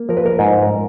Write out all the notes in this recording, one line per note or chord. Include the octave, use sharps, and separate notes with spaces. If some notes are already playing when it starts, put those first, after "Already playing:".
Already playing: A#3
F3 A#4
B4
A#4
G#2